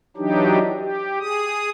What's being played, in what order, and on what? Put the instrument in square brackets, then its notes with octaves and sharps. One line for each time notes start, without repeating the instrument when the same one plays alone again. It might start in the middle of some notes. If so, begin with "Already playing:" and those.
[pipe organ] E3 F#3 D4 D#4 G4
G4
G#4 D#6